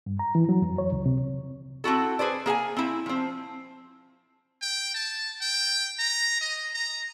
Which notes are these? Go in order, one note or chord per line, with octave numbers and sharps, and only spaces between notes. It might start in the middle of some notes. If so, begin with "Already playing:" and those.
G2
A#5
E3
F#3
F2
C#5
C#2
C3
C4 E4 F#4 A4
G#4 B4 C5 D5
A#3 G#4 G5 G#5
C4 E4
F3 C4
G5
A5
G5
A#5
D#5
A#5